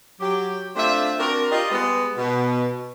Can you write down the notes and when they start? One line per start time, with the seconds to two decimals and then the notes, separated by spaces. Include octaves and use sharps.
0.21 F#3 G4
0.75 A3 C4 D4 F4 C5 E5
1.18 C4 D4 F#4 A#4
1.51 F4 G4 D5 D#5
1.71 G3 G#3 B3
2.16 B2